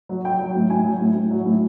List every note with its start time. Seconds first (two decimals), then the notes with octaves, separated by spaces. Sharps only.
0.09 F#3
0.24 F#3 G5
0.40 F#3
0.55 A2
0.70 A2 G#5
0.84 F#3
1.00 A2
1.15 A2
1.31 F#3
1.45 A2